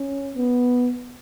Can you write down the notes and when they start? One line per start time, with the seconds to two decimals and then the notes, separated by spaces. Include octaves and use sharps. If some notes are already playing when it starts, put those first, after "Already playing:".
Already playing: C#4
0.35 B3